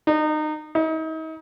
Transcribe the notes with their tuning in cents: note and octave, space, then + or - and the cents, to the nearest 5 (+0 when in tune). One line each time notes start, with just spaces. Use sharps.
D#4 -25
D#4 +40